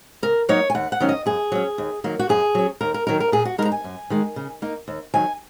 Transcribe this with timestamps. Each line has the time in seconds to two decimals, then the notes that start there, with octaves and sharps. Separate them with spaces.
0.22 C#3 A#4
0.49 F#3 A#3 D#4 C#5
0.70 G#5
0.75 D#2 F#5
0.92 F#5
1.00 D#3 F#3 C#4
1.09 D#5
1.26 F#2 G#4
1.52 F#3 C#4
1.78 D#2
2.04 D#3 F#3 A#3
2.19 F#4
2.29 F#2 G#4
2.55 F#3 C#4
2.81 D#2 A#4
2.94 A#4
3.07 D#3 F#3 D#4 A#4
3.20 A#4
3.32 A#2 G#4
3.45 F#4
3.58 G#3 D#4 A#4
3.65 A#5
3.72 G#5
3.84 F#2
4.10 D#3 G#3
4.36 C#3
4.62 A#3 D#4
4.88 D#2
5.14 D#3 F#3 G#5